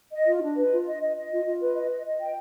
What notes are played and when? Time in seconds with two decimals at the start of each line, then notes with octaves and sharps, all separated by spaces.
0.12 D#5
0.27 F4
0.42 D4
0.57 B4
0.72 F4
0.86 D#5
1.01 D#5
1.16 D#5
1.31 F4
1.45 F4
1.61 B4
1.76 D#5
1.91 D#5
2.05 D#5
2.20 G5